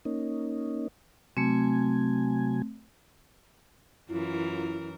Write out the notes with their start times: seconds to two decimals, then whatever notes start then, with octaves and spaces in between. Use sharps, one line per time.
0.05 A#3 C#4 D#4
1.37 C3 F#3 A3 C4 G#5
4.09 F#2 E3 E4 F4 A#4